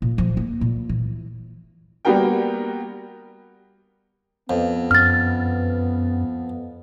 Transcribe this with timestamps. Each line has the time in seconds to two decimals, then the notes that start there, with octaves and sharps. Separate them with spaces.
0.02 A#2
0.18 F3
0.37 A#3
0.61 A#2
0.89 E3
2.05 G3 A#3 B3 F#4 A#4 G5
4.50 F2 B3
4.91 F#2 F6 A6